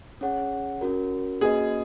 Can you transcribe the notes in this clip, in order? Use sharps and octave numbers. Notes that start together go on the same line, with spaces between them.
C#4 G#4 C#5 F#5
C#4 F#4 A#4
A#3 C#4 F#4 G#4 B4 D#5